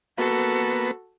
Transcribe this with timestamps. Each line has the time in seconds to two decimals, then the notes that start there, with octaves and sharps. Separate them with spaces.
0.18 A#3 B3 F#4 A4 B4